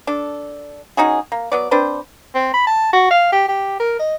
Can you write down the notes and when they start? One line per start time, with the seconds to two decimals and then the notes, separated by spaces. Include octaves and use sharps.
0.07 D4 A4
0.97 C#4 D#4 F#4 G#4
1.32 A#3
1.52 F#3 B3 D5
1.71 C4 D4 B4 C5
2.35 C4
2.54 B5
2.67 A5
2.93 F#4
3.10 F5
3.32 G4
3.48 G4
3.80 A#4
3.99 D#5